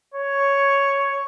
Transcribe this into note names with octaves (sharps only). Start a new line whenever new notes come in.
C#5